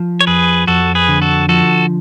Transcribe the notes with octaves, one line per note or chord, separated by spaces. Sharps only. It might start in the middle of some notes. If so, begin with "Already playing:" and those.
Already playing: F3
C#5
F2 G#4 B4
F2 F#4 A4
G#4 B4
D3
F#4 A4
F3 F#4 A4